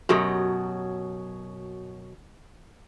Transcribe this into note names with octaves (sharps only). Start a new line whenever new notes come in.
F#2 B2 F#3 F#4 G4 D#6